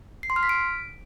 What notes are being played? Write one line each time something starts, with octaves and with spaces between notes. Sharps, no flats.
C7
C6
F6
B6
D7